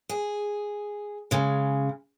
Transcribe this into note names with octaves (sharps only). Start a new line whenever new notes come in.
G#4
C#3 G#3